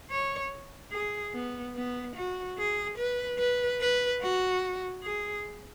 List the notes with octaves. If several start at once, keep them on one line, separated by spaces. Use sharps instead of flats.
C#5
G#4
B3
B3
F#4
G#4
B4
B4
B4
F#4
G#4